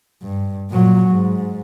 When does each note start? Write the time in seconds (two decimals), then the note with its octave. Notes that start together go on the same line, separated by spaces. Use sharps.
0.23 G2
0.70 A#2 F#3
1.09 G#2